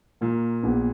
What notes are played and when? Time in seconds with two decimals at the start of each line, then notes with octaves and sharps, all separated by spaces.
0.21 A#2 A#3
0.63 A#1 B3